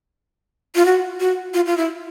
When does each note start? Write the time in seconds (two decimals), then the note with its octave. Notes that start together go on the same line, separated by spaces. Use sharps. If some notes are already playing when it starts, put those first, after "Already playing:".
0.75 F4
0.85 F#4
1.20 F#4
1.54 F4
1.66 F4
1.77 E4